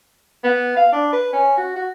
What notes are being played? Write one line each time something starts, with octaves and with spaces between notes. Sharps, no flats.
B3
F5
D4
B4
C#4
F#4
F#4